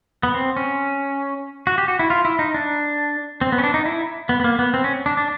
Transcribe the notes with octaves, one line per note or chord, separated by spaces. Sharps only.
B3
C4
C#4
F#4
G4
F#4
E4
F4
E4
D#4
D4
C4
B3
C#4
D4
D#4
E4
B3
B3
A#3
B3
C4
C#4
D4
D4